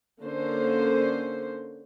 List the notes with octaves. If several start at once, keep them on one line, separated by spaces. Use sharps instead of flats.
D3 A#3 C#4 C5